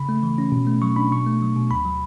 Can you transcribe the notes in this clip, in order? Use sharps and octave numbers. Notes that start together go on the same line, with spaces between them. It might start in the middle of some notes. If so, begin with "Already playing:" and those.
Already playing: C#3 B5
A3
E3
C#4
B2
A3
F#3 C#6
D4 B5
B2 C#6
A3
F#3
B2
D2 B5
F#3